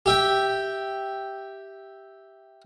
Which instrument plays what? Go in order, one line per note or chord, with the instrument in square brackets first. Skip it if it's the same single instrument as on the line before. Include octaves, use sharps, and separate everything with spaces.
[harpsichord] G4 E5 G5